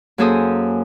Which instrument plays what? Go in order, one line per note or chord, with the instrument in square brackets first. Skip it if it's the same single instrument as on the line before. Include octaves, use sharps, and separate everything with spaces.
[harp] F#2 A#3 G#4 A4 C5 D#6